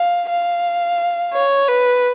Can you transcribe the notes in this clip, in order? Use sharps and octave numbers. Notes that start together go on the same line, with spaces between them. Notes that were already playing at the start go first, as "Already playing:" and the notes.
Already playing: F5
F5
C#5
B4